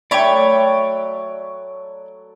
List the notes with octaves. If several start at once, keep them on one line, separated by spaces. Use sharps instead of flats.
F#3 A3 C#5 D5 G5 B5